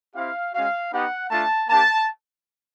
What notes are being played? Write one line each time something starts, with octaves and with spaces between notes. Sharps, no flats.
C4 E4 G4 F5
G#3 C#4 F#4 F5
B3 D#4 G4 F#5
A3 D4 F4 A5
A#3 D4 G4 A5